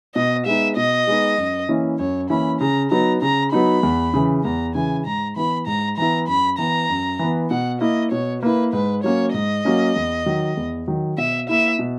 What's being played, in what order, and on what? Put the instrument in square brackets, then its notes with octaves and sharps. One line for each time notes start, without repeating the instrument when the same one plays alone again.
[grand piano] B2 [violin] D#5
[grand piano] G#3 B3 D#4 [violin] E5
[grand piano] B2 [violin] D#5
[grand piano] G#3 B3 D#4
F#2
E3 A#3 C#4 E4
[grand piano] F#2 [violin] C#5
[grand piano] E3 A#3 C#4 E4 [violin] B5
[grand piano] C#3 [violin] A#5
[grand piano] F#3 B3 D#4 [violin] A#5
[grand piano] C#3 [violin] A#5
[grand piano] F#3 B3 D#4 [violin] B5
[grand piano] E2
C#3 E3
[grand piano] E2 [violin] A#5
[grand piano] C#3 E3 [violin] G#5
[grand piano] G#2 [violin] A#5
[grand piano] E3 B3 E4 [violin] B5
[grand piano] G#2 [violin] A#5
[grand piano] E3 B3 E4 [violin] A#5
[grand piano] F#2 [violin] B5
[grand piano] E3 B3 [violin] A#5
[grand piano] F#2
E3 B3
[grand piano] B2 [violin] F#5
[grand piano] A#3 E4 [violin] D#5
[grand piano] B2 [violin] C#5
[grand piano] A#3 E4 [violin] B4
[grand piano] G#2 [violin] B4
[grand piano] F#3 A#3 C#4 [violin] C#5
[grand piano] G#2 [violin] D#5
[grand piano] F#3 A#3 C#4
E2
D#3 F#3
E2
D#3 F#3
[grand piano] B2 [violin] E5
[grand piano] A#3 E4 [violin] E5
[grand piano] B2